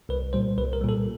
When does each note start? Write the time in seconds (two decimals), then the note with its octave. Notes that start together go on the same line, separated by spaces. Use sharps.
0.09 C2 B4
0.33 A#2 G3 C5
0.57 C2 B4
0.73 A#4
0.81 A#2 G3
0.89 A4